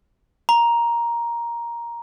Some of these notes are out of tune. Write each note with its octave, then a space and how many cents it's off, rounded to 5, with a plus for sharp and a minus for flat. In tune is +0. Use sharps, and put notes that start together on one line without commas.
A#5 +10